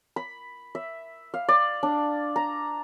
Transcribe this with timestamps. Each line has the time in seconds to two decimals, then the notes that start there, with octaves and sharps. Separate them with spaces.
0.16 B5
0.75 E5
1.34 F5
1.49 D5
1.83 D4
2.36 A#5